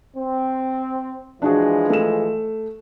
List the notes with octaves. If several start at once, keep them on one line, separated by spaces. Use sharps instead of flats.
C4
E3 F3 G#3 D4 F#4 G#4
A3 E7